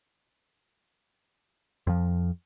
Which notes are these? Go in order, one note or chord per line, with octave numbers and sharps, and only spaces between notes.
F2 F3